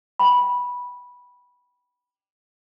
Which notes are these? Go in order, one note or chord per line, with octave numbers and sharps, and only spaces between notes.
G5 B5